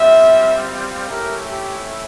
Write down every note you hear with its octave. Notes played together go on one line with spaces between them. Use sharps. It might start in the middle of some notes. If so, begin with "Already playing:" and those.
Already playing: G3 C4 F4 E5
A3 C#4 E4 G4 A#4
G4